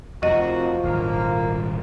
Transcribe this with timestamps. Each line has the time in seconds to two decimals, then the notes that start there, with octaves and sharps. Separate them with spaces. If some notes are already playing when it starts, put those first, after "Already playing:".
0.23 F2 C3 F3 A#3 F#4 D#5
0.83 D#1 G#1 A#3